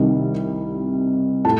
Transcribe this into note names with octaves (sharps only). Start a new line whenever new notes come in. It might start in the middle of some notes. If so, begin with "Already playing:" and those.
Already playing: C2 C3 D#3 G3
A2 A5